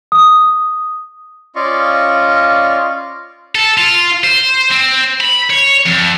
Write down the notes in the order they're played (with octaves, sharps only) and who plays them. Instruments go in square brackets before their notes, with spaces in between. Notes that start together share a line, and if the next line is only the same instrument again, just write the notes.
[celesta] D#6
[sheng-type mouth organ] C#4 F4 D5 D#5 F5 C#6
[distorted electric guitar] A4
F4
C5
C4
B5
C#5
F2